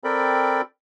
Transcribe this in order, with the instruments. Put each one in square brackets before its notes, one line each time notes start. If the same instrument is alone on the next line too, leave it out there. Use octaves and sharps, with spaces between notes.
[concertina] C4 A4 A#4 D5 G5 B5